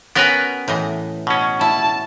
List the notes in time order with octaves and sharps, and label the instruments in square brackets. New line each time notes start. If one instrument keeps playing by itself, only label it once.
[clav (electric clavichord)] B3 A#4 B4 [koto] C#4 F#4 G5
[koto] A2 E3 D#5
[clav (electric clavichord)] B2 C#4
[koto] E4 [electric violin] A5